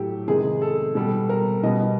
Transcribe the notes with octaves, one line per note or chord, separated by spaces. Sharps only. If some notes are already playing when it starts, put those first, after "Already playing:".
Already playing: A2 F#3 A3 G4 A4
C3 D#3 G#3 B3 G#4
A4
B2 G3 B3 A4
A#4
B2 G3 B3 D#5